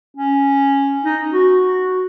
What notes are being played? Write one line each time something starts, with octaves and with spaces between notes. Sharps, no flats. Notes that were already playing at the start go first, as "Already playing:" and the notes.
C#4
D#4
F#4